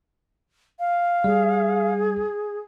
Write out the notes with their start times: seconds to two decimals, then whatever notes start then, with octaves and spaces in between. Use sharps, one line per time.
0.79 F5
1.24 G3 G#4